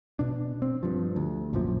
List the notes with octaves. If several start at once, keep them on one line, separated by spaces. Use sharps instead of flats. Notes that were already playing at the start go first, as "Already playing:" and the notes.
B2 D4
C4
G2 F3
D2
A#1 F#2 A#2 F3